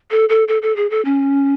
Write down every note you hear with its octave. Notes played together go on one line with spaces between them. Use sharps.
A4
A4
A4
A4
G#4
A4
C#4